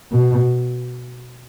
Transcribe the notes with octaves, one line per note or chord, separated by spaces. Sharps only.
B2